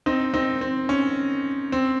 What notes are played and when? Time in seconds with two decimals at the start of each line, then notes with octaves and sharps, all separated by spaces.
0.06 C4 D#4
0.34 C4 D#4
0.61 C4
0.89 C#4
1.72 C4